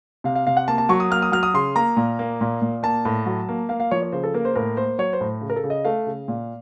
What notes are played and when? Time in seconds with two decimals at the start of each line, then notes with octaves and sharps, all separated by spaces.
0.24 C3 F5
0.35 F5
0.47 C3 F5
0.57 F#5
0.68 A#3 A5
0.78 A5
0.89 F#3 C#6
1.00 D#6
1.10 A#3 F6
1.22 D#6
1.32 F#3 F6
1.43 D#6
1.54 C#3 C6
1.76 A#3 A#5
1.97 A#2
2.19 A#3
2.41 A#2
2.62 A#2
2.83 A#3 A5
3.05 A2
3.26 F#3
3.49 A#3
3.69 A#3 F5
3.80 F5
3.91 F3 C#5
4.02 C#5
4.12 C#3 C5
4.24 A4
4.34 A#3 A#4
4.45 C5
4.55 A2 A#4
4.77 A#3 C5
4.98 F#3 C#5
5.13 C5
5.21 A2
5.41 C#3
5.50 A#4
5.56 A4
5.64 C#3
5.70 D#5
5.85 A3 F5
6.07 C#3
6.28 A#2